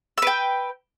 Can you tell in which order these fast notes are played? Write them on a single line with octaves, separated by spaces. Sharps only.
E6 B4 G5